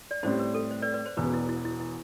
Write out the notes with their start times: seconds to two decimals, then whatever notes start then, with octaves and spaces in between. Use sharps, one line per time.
0.11 D5
0.23 A2 G3 C4 C5
0.39 B4
0.55 A4
0.71 C5
0.82 B4 D5
0.94 B4 D5
1.06 C5
1.17 E1 E2 B2 B3 B4
1.33 E4
1.49 E4
1.65 E4
1.80 E4